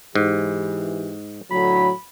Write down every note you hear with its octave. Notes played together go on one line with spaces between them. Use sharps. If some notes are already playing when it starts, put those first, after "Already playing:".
G#2 E3 G4
A2 D3 F#3 B5